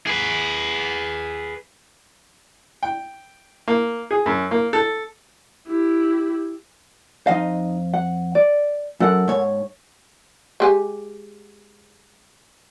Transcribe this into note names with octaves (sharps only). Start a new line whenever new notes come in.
G#4 B4
G5
A#3
G#4
F#2
A#3
A4
E4 G4
F2 D#4 D#5 F5
F#5
D5
F#2 A4 A#4 F#5
G#2 C#5
G#3 G4 G#5